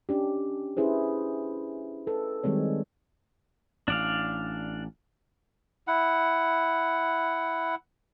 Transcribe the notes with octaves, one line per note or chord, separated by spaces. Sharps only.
C#4 D4 G4
C#4 E4 G#4 B4 C5
A4 B4
D#3 G3 G#3 C4 C#5
A1 D4 D5 F5
E4 F#5